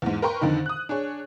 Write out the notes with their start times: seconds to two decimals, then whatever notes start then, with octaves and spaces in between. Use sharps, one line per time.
0.02 E2 G#2
0.22 A#4 B4 G5 A#5 C6 C#6
0.41 F2 D3 D#3 D#4
0.66 D#6 F#6
0.89 D4 G#4 C#5